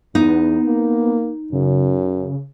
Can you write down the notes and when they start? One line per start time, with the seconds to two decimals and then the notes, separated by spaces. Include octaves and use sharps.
0.15 E2 B3 D#4
0.65 A#3
1.53 F#2 C#3